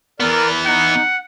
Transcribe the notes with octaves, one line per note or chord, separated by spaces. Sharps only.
E3 B3 A#4 D5
D#4 F#5